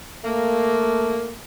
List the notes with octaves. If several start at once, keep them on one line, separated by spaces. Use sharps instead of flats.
A3 A#3